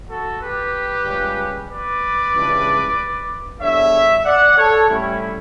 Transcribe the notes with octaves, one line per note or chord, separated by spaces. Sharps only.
F#4 A4
G4 B4
C#2 C#3 G3 C#4
B4 D5
C#2 C#3 E3 G3 D4
E2 D3 G3 D4 C#5 E5
D5 F#5
A4 C#5
A2 G3 C#4 E4